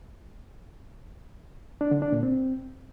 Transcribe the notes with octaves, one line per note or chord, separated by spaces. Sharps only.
D4
D3
D4
A#2
C4